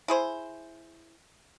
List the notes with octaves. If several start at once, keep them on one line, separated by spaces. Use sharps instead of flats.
E4 G#4 C5